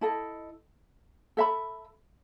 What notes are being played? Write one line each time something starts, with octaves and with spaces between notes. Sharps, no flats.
E4 A4 D#5
A4 E5 B5